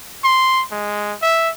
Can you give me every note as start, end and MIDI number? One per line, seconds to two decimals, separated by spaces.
0.24 0.63 84
0.72 1.15 56
1.22 1.50 76